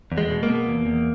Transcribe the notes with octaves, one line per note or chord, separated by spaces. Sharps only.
E2
G#3
B2
A#3
B2
E2
E2